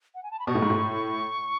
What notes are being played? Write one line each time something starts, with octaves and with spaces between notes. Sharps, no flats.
F#5
G#5
A5
B5
B2 C#6
A2
G#2
A2